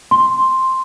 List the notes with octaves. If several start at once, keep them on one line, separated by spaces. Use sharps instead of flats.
C6